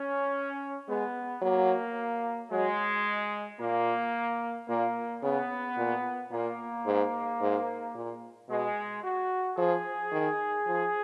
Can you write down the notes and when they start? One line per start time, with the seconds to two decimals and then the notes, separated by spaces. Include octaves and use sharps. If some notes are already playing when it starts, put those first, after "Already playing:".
Already playing: C#4
0.88 G#3 B3
1.42 F#3 A#3
2.51 F#3 G#3
3.60 A#2 A#3
4.68 A#2 A#3
5.22 C#3 B3
5.77 A#2
6.32 A#2 A#3
6.86 G#2
7.40 G#2
7.95 A#2
8.49 B2 G#3
9.03 F#4
9.58 F3 G#4
10.12 D#3
10.67 F3